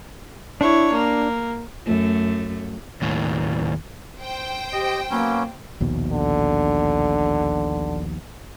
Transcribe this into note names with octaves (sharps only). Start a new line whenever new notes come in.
D4 E4 C#5
A#3
F#2 A3
D#2 A2
C5 G5
G4 D#5
F#3 A#3 B3 C#4
A#1 D#2 B2
D3